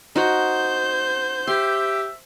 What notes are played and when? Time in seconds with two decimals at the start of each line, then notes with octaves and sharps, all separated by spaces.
0.16 D#4 F#4 C5 G6
1.47 G4 E5 C6